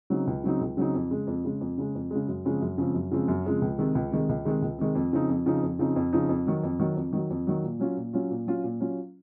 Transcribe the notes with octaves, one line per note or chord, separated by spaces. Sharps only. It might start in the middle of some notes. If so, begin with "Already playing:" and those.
C#3 F#3 C4 D#4
C#2
C#3 F#3 C4 D#4
C#2
C#3 F#3 C4 D#4
F2
C#3 G#3
F2
C#3 G#3
F2
C#3 G#3
F2
C#3 G#3
F#2
C#3 F3 G#3 C4
F#2
C#3 F3 G#3 C4
F#2
C#3 F3 G#3 C4
F#2
C#3 F3 G#3 C4
C#2
C3 D#3 G#3
C#2
C3 D#3 G#3
C#2
C3 D#3 G#3
C#2
C3 D#3 G#3
F2
C#3 F3 C4 D#4
F2
C#3 F3 C4 D#4
F2
C#3 F3 C4 D#4
F2
C#3 F3 C4 D#4
F2
D#3 F#3
F2
D#3 F#3
F2
D#3 F#3
F2
D#3 F#3
A#2
F#3 C#4 F4
A#2
F#3 C#4 F4
A#2
F#3 C#4 F4
A#2
F#3 C#4 F4